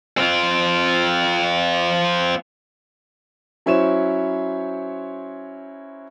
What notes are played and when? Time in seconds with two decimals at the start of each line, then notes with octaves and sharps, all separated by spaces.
0.17 C4 F4
3.66 F#3 C#4 E4 C5 C#5 E7